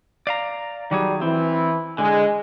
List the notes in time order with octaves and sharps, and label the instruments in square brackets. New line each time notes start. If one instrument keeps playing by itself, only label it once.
[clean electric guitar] D5 F5 A#5
[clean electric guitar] D#3 F#3 G#4 [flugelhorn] G3
[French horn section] E3 [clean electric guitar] C4 [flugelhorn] E4
[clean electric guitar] D3 [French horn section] G#3 [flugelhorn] G#5